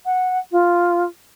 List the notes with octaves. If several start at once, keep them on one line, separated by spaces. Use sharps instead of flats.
F#5
F4